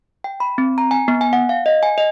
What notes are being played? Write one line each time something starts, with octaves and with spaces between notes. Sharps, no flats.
G5
B5
C4
A#5
G#5
B3
G#5
F#5
F5
D#5
G#5
D#5